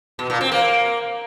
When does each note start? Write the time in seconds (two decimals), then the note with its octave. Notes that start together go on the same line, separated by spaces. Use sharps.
0.19 B2
0.30 A#2
0.41 C4
0.52 A#3